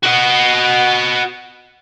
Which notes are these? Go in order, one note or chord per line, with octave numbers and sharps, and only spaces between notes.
F#4 D#5